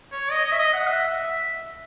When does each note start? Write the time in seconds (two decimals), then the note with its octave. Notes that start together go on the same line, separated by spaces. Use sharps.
0.12 C#5
0.31 D#5
0.45 D#5
0.52 E5
0.58 D#5
0.73 F#5
0.87 E5